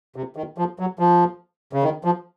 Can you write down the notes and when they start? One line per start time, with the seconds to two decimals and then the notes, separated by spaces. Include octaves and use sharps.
0.16 C3
0.36 D#3
0.58 F3
0.79 F#3
0.99 F3
1.73 C#3
1.83 D#3
2.04 F3